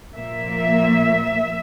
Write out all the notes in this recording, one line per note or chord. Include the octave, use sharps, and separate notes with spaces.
A#2 F3 A#3 E5